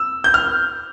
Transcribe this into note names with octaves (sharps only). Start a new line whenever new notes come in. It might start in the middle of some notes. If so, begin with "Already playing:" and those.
Already playing: E6
G6
F6